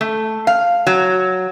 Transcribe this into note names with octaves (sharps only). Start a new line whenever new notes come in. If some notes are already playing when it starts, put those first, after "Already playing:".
A3
F5
F#3